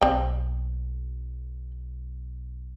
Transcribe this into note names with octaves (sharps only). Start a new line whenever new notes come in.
B1 C4 G5